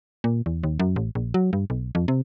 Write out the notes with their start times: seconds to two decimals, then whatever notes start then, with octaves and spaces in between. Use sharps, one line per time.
0.24 A#2
0.46 E2
0.64 D#2
0.80 F#2
0.96 A1
1.15 A#1
1.34 F#3
1.53 G2
1.70 B1
1.95 F2
2.08 C3